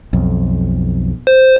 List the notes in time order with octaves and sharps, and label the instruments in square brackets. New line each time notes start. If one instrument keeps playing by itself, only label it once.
[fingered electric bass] B1 F2
[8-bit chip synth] C5